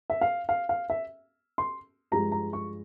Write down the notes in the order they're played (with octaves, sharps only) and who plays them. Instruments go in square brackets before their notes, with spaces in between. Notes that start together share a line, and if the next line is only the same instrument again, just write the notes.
[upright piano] E5
F5
F5
F5
E5
C6
G2 F3 G#3 A#5
A#5
C#6